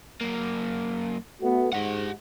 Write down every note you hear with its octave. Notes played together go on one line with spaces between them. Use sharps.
F#2 A#3
A3 B3 F#4
G#2 G4 F#5